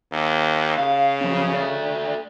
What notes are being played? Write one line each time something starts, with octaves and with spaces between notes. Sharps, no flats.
D#2
C#3 F5
F3 F#3 C#4
A3 D5